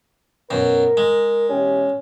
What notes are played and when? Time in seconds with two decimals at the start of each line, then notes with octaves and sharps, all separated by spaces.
0.51 F#2 B2 A#4
0.97 G#3
1.49 B2 E3 C#4 G4